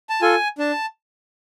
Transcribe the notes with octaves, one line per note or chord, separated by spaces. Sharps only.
A5
F4 A4 G#5
D4 A5